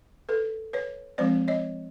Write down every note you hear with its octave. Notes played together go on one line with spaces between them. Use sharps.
A4 B4
B4 C#5
F3 G#3 C4 C5 D5
C#5 D#5